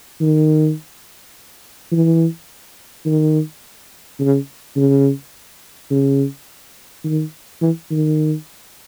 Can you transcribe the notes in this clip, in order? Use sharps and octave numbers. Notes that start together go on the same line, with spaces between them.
D#3
E3
D#3
C#3
C#3
C#3
D#3
E3
D#3